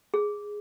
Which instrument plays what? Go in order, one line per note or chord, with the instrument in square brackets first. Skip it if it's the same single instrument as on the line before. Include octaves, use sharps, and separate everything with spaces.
[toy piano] G#4